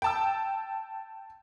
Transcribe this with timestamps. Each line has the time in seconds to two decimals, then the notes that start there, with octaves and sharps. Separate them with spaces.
0.02 G5 A5 E6